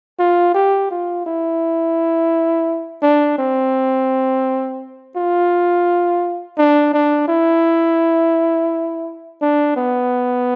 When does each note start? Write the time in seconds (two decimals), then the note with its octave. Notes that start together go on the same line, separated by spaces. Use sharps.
0.19 F4
0.54 G4
0.91 F4
1.26 E4
3.02 D4
3.39 C4
5.16 F4
6.58 D4
6.94 D4
7.28 E4
9.41 D4
9.76 B3